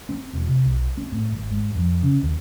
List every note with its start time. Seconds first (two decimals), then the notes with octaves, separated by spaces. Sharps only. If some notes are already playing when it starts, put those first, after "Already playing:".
0.09 C4
0.33 E1
0.48 C3
0.65 B1
0.97 C4
1.12 A2
1.32 G#1
1.51 G#2
1.75 F2
2.03 C#3
2.23 D#2